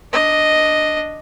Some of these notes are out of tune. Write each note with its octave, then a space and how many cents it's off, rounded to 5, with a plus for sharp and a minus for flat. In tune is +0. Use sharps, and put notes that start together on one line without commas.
D4 +10 D#5 +0